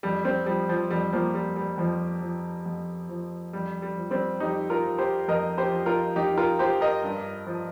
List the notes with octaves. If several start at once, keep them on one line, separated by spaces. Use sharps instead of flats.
F2 G3
G3 C4
F3 G3
F3
F2 G3
F3 A#3
F3 G3
G3
F2 F3
F3
F2
F3
F2 G3
G3
F3
G3 C4
F2 D#4 G4
F4 A#4
F3
G4 C5
F2 A#4 D#5
G4 C5
F3
F4 A#4
F2 D#4 G4
F4 A#4
F3 G4 C5
A#4 D#5
G2
F3